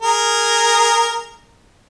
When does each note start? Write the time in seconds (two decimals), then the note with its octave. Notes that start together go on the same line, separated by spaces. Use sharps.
0.02 G#4 A#4